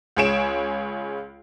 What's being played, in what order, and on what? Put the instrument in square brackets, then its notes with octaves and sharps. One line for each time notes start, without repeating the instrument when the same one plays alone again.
[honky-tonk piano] C#2 G#3 G#4 C#5 D7 E7